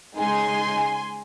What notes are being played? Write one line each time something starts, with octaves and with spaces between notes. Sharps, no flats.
C#3 G#3 D#4 G#5 C6